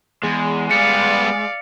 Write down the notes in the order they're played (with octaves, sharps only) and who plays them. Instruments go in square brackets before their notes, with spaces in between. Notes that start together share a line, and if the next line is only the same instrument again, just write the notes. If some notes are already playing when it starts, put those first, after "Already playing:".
[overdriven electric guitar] E2 [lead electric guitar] G#3
[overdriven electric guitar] G3 B3 [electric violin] D5 F5 [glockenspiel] C#7